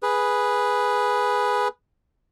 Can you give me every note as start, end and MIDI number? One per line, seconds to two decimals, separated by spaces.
0.03 1.68 68
0.03 1.68 71